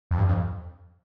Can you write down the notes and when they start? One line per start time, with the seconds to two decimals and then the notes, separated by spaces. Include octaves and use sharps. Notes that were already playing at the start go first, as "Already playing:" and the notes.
0.11 F2
0.18 G2
0.28 F2